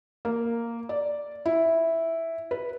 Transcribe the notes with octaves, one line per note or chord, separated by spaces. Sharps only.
A#3
D5
E4
B4